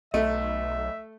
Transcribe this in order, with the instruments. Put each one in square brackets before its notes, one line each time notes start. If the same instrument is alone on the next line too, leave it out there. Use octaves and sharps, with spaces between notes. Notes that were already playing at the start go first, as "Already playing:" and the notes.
[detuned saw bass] B1 [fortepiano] A3 [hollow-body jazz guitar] D#5 [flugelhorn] E5